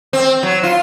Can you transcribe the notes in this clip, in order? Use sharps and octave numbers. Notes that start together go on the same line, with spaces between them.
C4
F#3
F4